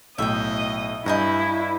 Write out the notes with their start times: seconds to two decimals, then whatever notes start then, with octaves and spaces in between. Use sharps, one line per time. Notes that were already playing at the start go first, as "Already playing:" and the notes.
0.18 B1 A2 D#5 E5 G5
1.06 G2 E4 D#5 G#5 A#5 G6